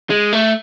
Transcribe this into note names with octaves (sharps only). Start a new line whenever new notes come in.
G#3
A3